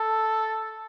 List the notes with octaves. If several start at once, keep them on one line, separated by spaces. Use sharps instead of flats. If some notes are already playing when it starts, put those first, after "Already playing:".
Already playing: A4